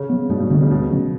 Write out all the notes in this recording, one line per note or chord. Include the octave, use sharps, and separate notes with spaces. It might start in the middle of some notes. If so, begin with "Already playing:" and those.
Already playing: C#3
F#3 B3
G2 B2
B2
B2 D3 G3 D4
C#3
D2 B2
C#3 F#3 C#4